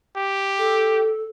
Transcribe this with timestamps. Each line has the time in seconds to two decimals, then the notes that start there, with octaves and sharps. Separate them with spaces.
0.16 G4
0.58 A4